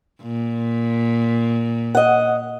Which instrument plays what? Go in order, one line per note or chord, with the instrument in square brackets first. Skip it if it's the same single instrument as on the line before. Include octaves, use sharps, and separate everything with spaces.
[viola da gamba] A#2
[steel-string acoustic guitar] D#5 F#5